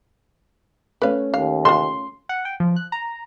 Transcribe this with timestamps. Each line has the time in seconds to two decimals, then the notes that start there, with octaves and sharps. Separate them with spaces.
1.02 A3 C#4 B4 F5
1.34 D#2 F5
1.65 F4 A4 C6
2.29 F#5
2.45 G5
2.60 F3
2.76 F#6
2.92 A#5